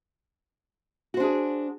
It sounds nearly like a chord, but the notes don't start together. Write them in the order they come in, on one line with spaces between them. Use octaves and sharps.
F#4 C5 D4 G#4